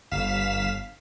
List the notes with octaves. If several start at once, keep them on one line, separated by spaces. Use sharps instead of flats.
G1 F5 B6 E7